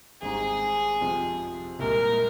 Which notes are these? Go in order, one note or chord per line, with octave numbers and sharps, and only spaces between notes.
G#1 G#2 G3 C4 D#4 G#4
F2 C3 F3
C2 A#2 G#3 A#4